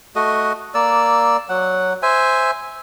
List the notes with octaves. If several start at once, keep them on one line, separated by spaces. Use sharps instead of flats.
A3 F#4 D#5
A#3 D5 E6
F#3 F#5
C5 E5 G#5